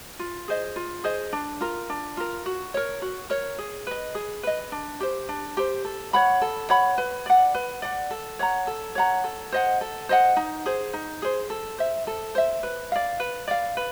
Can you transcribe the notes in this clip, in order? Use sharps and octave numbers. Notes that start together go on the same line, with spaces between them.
F4
G#4 C5 D#5
F4
G#4 C5 D#5
D4
F4 A#4
D4
F4 A#4
F#4
A#4 C#5
F#4
A#4 C#5
G#4
B4 D#5
G#4
B4 D#5
D4
G4 C5
D4
G4 C5
A4
C#5 F#5 B5
A4
C#5 F#5 B5
B4
D5 F#5
B4
D5 F#5
A4
C#5 F#5 A#5
A4
C#5 F#5 A#5
A4
C5 D#5 F#5
A4
C5 D#5 F#5
D#4
G#4 C5
D#4
G#4 C5
A4
C5 E5
A4
C5 E5
B4
D5 F5
B4
D5 F5
B4